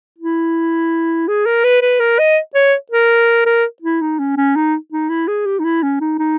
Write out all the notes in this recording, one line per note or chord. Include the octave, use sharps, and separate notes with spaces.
E4
G#4
A#4
B4
B4
A#4
D#5
C#5
A#4
A#4
E4
D#4
C#4
C#4
D#4
D#4
E4
G#4
G4
D#4
E4
C#4
D#4
D#4